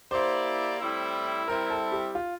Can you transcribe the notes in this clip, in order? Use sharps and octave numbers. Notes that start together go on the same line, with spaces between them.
A#3 E4 G4 C5 D5
A2 G3 C4 E4
G3 C4 E4 A#4
A4
G4
F4